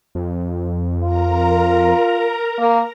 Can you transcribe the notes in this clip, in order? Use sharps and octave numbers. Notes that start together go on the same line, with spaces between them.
F2
F4 A#4 A#5
A#3